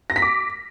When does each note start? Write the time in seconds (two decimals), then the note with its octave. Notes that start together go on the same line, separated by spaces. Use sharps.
0.10 A#6
0.16 B6
0.22 D6